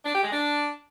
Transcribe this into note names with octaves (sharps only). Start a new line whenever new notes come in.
D4
G4
G#3
D4